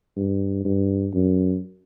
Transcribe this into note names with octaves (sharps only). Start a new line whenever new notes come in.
G2
G2
F#2